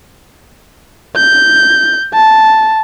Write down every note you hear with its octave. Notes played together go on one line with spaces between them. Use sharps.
G6
A5